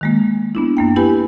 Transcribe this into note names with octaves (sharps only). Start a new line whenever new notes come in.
D#3 G#3 A#3
B3 D4 E4
F#2 A#3 G5
E4 G4 B4 G#5 B5